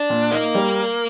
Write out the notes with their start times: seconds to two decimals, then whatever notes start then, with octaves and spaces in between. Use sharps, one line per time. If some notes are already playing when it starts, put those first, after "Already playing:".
Already playing: D4
0.10 A#2
0.31 A#3 D#4
0.55 G3